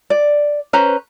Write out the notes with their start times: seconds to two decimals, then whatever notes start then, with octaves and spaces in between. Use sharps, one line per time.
0.10 D5
0.73 C#4 B4 C5 A#5